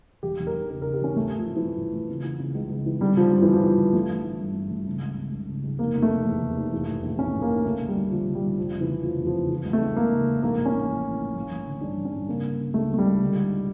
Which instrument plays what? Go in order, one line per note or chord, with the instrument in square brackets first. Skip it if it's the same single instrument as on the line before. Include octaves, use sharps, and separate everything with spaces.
[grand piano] E1 G4
E1
A#4
E1
C#3 A#4
C#3 A#4
G4
E1 C#4
A1 A3
A2
F3
E3
E3
A1 F3
A1
A1
C#3
E3
C#3
C#2
C#2
E3
D3 G3
D3 F3
G2 F3
E3
D3
F3
G1
G1
A1 A3
A1
E3
G2
G2
A1
C#3
C#2
C#3
C#2
C#3
C#2
F1 A#3
F1
A3
F1
E2
E2
F1
E3
A2
A#1
A2 C#4
A2
A#3
A#1
D2 A3
D2
G3
D2
D3 F3
D3
G3
D3
F1 F3
C#3
E3
F1
F1 F3
E2
F3
C#3
E3
C#2
A3
C#2
C#2 A#3
C#3
C#2
A#1 A#3
A2
C#4
A#1
E3
E3
A2
A1
A1
D3
G2 D4
A1
C#4
G2
C#3 A#3
C#3
C#3
C#2 A3
C#2 A3
G3
C#2
D3
D3